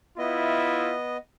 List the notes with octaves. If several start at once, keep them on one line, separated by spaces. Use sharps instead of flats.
B3 E4 F4 D#5 E5